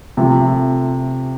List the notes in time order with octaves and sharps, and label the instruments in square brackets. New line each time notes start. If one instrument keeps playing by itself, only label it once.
[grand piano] C3 F3 A3